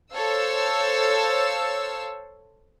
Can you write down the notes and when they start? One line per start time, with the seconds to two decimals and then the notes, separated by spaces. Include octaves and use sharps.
0.13 A4 C5 C#5 F5 E6